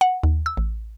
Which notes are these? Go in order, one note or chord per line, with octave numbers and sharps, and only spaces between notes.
F#5
D#2
E6
A1